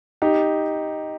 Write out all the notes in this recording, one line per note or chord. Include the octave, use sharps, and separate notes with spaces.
D#4 G4